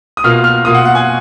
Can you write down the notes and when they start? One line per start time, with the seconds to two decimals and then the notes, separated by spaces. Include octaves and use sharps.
0.17 D#6
0.24 B2 A#3 F4 F6
0.44 F6
0.65 B2 A#3 F4 D#6
0.75 F#5
0.85 F#5
0.95 G#5